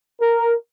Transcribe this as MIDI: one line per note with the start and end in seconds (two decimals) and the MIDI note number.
0.21 0.53 70